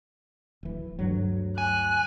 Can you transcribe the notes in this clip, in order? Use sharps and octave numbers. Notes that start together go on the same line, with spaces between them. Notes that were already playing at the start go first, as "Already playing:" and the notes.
D1 E3
D2 G2 F#3
G#5 F#6